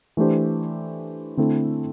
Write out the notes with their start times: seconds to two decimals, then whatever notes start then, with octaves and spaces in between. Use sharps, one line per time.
0.17 E3 A3 D4 G4 C5
1.37 D3 A3 C4 E4 A4